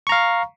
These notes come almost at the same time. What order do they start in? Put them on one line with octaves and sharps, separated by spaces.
C#6 A#5 F5